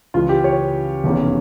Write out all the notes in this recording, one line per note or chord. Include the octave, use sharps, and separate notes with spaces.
C#2 C#3 E3 F4
G4
C#5
F1 E2 C#3